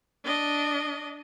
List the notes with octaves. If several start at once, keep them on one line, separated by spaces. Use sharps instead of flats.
D4 D#5